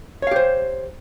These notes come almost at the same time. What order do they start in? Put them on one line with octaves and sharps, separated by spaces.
C#5 F5 G4 C5